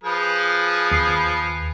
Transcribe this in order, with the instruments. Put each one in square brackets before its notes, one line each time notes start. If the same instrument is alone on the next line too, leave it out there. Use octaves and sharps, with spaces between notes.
[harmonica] F3 G#4 B4
[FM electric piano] D#2 C7